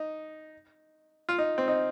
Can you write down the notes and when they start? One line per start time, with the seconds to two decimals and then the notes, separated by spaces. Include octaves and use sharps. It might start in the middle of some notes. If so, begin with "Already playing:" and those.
Already playing: D#4
1.29 F4
1.38 D#4
1.58 C4
1.68 D#4